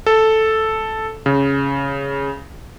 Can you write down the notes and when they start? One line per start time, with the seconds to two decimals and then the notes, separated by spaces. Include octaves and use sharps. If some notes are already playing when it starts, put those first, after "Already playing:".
0.06 A4
1.26 C#3